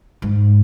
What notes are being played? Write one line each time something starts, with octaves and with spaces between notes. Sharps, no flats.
G#2